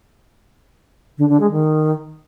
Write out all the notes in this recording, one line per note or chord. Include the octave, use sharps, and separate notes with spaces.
D3
D3
G#3
D#3